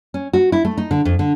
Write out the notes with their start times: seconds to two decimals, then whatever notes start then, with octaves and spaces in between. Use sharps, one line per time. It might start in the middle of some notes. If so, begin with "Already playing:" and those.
0.14 C#4
0.33 F#4
0.52 E4
0.65 A3
0.77 D#4
0.91 D3
1.05 F2
1.19 D3